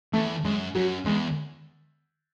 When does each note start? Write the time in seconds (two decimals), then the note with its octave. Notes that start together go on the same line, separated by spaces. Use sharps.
0.13 E2 A3
0.44 F#2 G#3
0.75 F#2 F#3
1.05 E2 G#3